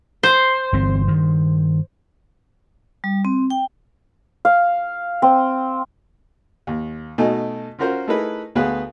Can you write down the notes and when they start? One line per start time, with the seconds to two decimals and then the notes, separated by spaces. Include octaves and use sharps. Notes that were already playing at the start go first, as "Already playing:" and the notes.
0.23 C5
0.73 G1 E3 C4
1.07 G2 D#3
3.04 G3
3.25 C4
3.50 G5
4.45 F5
5.22 C4
6.67 D#2
7.18 B2 A3 D#4 G#5
7.79 C#4 F4 F#4 A#4 C5 F#5
8.08 A3 D#4 E4 G#4 A#4 B4
8.55 D2 B3 G#4 B4 F5 F#6